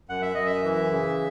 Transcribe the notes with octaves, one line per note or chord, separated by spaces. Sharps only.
F#2 F#5
E5
F#2 D#5
E5
E3
C#3